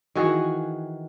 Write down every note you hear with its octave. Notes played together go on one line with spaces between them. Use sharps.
D#3 E3 F#4 G#4